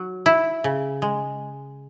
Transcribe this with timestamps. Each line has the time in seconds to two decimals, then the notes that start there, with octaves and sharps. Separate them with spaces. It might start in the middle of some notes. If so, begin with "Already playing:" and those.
Already playing: F#3
0.26 E4
0.64 C#3
1.02 G#3